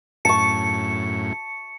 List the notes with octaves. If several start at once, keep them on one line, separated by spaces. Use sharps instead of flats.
F#2 A2 A5 C#6 C#7